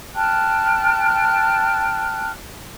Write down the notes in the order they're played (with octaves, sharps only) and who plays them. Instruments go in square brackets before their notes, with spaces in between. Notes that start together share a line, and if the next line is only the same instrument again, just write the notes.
[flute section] G5 A5 F6 F#6